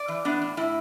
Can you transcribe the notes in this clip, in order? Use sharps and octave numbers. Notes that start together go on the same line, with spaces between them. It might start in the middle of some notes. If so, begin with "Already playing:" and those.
Already playing: D5
E3
B3 D4
A2
A2 E4